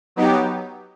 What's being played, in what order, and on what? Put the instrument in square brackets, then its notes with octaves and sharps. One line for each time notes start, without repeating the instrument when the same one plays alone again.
[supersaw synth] F#3 B3 D#4 G4